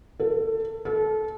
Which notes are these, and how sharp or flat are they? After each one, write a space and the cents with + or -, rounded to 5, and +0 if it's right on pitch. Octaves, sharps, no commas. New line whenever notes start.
A4 +20
A4 -25